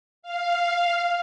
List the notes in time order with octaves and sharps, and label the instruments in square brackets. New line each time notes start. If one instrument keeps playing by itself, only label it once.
[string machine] F5